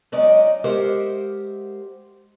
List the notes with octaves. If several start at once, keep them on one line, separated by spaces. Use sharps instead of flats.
F#3 G#3 C#4 D#4 D5 D#5
G#3 G4 A#4 C5 E5 F#5